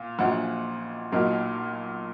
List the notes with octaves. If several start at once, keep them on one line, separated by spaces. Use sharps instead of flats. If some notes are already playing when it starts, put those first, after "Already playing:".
Already playing: A#2 F5
A#1 A#2 F#3 D#5 F#5
B1 A#2 F#3 A#3 D#4